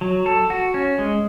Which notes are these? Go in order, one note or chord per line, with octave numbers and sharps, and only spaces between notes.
F#3
A4
F#4
C#4
G#3